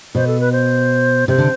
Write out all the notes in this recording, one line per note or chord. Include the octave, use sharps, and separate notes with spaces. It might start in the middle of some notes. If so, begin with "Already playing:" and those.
B2 C5
A4
B4
C5
C3 C5
D3